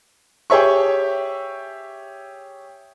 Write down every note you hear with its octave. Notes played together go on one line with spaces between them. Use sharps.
G4 G#4 C#5 E5 C#6